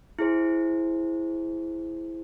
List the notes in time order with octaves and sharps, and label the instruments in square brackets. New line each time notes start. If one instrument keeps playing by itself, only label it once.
[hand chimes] E4 G#4 C5